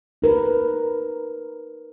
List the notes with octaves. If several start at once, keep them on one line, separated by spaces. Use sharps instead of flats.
D#4 A#4 B4